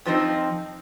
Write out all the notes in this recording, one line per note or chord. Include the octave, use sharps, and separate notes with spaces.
F2 F3 C4 D#4